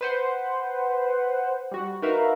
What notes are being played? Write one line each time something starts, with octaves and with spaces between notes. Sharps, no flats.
B4 C5 F#5
G3 F#4
D#4 F#4 A#4 B4 E5 F5